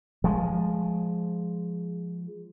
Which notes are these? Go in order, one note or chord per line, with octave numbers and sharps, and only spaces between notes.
F3 G#3